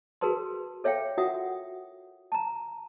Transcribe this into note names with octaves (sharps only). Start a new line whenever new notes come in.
F#4 G#4 A#4 B4 A5 C6
A4 C#5 E5 F5 G5
F4 F#4 A#4 E5 F#5 D#6
A5 A#5